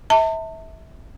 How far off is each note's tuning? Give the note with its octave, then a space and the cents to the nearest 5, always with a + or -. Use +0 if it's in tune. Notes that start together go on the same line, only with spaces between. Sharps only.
E5 -30 A5 +40